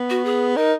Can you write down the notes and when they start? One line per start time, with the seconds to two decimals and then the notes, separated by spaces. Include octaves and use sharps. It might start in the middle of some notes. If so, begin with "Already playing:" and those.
Already playing: B3
0.10 F#4
0.25 G#4
0.57 D#4 A#4